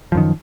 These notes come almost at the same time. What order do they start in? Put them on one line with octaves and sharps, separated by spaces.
F3 F#2 D#3